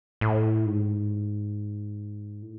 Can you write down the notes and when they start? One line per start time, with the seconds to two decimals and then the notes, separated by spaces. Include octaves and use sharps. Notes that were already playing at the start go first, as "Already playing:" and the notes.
0.21 A2
0.66 G#2
2.42 A2